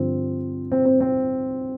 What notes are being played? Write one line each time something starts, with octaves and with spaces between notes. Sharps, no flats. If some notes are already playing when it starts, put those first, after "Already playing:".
Already playing: G2 D3 F3 C4
C4
C4
C4